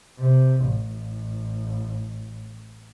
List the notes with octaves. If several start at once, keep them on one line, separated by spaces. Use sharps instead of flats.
C3
A1